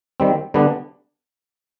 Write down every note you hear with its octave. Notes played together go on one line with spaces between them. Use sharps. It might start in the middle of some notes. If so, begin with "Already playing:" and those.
D#3 G3 C4
D3 G3 B3 D4